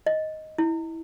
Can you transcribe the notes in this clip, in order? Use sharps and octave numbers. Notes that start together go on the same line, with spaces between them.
D#5
E4